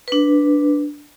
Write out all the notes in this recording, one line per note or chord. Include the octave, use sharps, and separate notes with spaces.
D4 B4